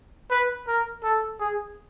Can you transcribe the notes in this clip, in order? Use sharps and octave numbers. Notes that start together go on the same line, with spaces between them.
B4
A#4
A4
G#4